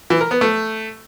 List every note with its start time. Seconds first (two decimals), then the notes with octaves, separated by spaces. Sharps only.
0.10 E3
0.21 A#4
0.31 B3
0.41 A3